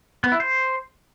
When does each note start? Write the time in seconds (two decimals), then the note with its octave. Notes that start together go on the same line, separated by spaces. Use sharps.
0.24 B3
0.32 E4
0.40 C5